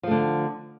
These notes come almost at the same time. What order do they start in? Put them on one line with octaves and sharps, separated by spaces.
F3 A3 D3